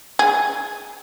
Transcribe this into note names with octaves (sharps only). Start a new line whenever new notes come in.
G#4